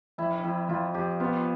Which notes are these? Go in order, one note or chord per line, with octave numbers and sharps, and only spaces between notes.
F2 E4
F2 E4
F2 F4
F2 G4
B3 F4